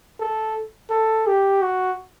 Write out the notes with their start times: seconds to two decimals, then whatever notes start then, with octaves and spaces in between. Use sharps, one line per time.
0.20 A4
0.91 A4
1.27 G4
1.62 F#4